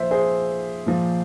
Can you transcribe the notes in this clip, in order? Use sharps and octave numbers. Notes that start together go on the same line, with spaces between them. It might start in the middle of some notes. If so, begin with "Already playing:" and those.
Already playing: A#2 F3 C5 E5
G#4 C5
A#2 F3